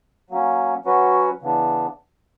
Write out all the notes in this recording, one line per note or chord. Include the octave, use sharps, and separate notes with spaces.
F#3 A#3 C#4
F#3 C#4 F#4 B4
C#3 E3 B3 D4